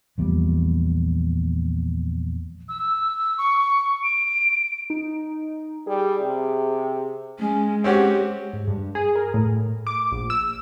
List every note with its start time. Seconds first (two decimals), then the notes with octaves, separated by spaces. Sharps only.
0.18 A#1 E2 A#2 G3
2.68 E6
3.38 C#6
4.03 D7
4.90 D#4
5.87 G3 G#4
6.22 C3
7.39 G#3 C#4
7.84 C4 C#4 F#4 G4
8.53 G#2
8.68 G2
8.95 G#4
9.15 A#4
9.34 A2
9.87 D6
10.12 A#1
10.30 E6